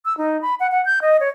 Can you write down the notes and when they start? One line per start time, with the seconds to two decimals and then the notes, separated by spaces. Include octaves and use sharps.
0.05 E6
0.18 D#4
0.42 B5
0.60 F#5
0.72 F#5
0.85 G6
1.02 D#5
1.20 C#5